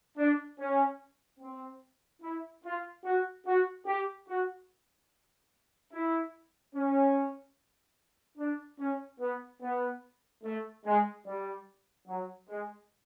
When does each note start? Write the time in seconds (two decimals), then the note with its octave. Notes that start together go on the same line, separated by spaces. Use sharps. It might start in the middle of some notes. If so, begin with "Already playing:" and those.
0.17 D4
0.58 C#4
1.40 C4
2.22 E4
2.64 F4
3.04 F#4
3.45 F#4
3.86 G4
4.28 F#4
5.92 E4
6.74 C#4
8.37 D4
8.78 C#4
9.19 B3
9.61 B3
10.43 A3
10.85 G#3
11.25 G3
12.07 F#3
12.49 G#3